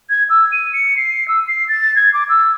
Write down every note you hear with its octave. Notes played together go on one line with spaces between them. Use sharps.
G#6
E6
D#7
C#7
C7
E6
C7
A6
G#6
D6
E6